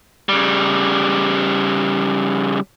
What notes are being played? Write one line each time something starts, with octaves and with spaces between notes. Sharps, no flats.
C#3 G3